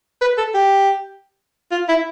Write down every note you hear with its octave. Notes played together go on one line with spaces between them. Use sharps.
B4
A4
G4
F4
E4